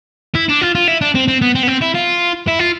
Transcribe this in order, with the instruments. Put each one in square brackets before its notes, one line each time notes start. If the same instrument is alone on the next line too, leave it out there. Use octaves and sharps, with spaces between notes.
[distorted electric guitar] E4
D4
F4
F4
E4
D4
C4
C4
B3
C4
B3
C4
E4
F4
E4
F4